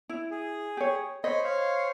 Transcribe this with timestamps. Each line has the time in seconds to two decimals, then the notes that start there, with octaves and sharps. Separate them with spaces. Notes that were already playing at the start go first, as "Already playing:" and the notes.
0.09 E4
0.31 G#4
0.77 G4 C#5
1.24 C5 C#5 D#5 B5
1.44 C5 C#5 F5